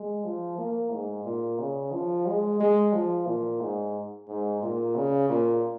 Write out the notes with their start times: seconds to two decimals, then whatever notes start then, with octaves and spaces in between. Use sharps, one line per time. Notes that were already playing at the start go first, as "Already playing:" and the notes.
Already playing: G#3
0.24 F3
0.58 A#3
0.92 G#2
1.25 A#2
1.59 C#3
1.92 F3
2.26 G#3
2.60 G#3
2.93 F3
3.27 A#2
3.60 G#2
4.28 G#2
4.62 A#2
4.95 C#3
5.29 A#2